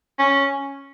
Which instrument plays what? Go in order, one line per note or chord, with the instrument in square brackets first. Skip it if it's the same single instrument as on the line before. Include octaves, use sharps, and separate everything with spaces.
[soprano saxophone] C#4